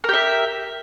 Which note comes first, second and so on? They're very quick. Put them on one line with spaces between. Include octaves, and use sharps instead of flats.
A#4 G4 E5